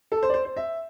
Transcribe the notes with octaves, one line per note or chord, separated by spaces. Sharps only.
A4
C5
D5
C5
C5
E5